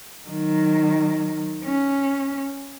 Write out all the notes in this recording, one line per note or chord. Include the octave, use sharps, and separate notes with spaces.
D#3 F#3
C#4